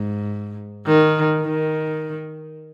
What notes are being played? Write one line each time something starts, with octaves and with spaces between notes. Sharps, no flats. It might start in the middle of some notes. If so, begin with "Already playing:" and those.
Already playing: G#2
D#3
D#3